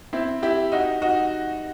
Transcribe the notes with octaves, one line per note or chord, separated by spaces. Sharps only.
C4 E4
E4 G4
D#4 F#4
D#4 F#4